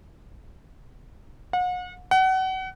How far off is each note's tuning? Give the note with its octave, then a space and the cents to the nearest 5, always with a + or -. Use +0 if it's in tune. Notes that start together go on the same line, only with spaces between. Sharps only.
F#5 -40
F#5 +30